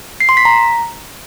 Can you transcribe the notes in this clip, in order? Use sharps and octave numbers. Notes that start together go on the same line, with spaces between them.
C7
C6
B6
A#5